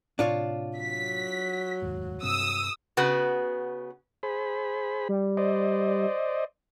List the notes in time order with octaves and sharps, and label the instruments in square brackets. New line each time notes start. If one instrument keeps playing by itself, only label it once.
[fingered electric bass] A2 C3 [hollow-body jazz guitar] D4 F4 C#5
[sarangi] F#3 [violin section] B6
[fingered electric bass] F1 D#2 G#2
[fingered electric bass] G2 C3 C4 [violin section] D#6 E6
[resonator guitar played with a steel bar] C#3 B3 F#4 B4
[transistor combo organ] G#4 C5 B5
[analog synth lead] G3
[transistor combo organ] C5 D5 D#5